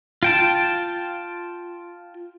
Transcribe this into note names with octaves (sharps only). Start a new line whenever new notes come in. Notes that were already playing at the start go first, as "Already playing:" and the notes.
F4 G5 A5